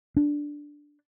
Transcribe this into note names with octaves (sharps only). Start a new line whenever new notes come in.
D4